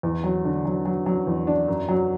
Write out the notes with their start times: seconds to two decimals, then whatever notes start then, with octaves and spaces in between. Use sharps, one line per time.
0.03 E2
0.24 F#3
0.45 D3
0.65 F#3
0.85 F#3
1.06 F#3
1.27 E2
1.47 D4
1.68 F#2
1.89 F#3